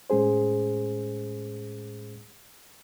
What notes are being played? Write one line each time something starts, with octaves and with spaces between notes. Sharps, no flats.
A2 G#3 C#4 G#4 C5